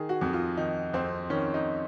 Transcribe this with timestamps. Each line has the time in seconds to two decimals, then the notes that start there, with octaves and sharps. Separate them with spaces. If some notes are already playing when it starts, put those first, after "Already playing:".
Already playing: D#3 G#4
0.09 F#4
0.21 F2
0.33 F4
0.57 D#3 D#4
0.93 F2 C4
1.30 D#3 C#4
1.54 D#4